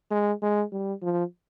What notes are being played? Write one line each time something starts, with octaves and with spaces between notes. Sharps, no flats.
G#3
G#3
G3
F3